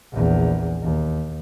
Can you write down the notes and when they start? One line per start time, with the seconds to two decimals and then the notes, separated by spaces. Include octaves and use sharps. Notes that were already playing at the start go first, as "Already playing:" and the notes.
0.12 A#1 E2
0.82 D#2